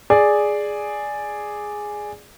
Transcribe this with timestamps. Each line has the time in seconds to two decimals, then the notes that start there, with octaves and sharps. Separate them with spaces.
0.10 G#4 D5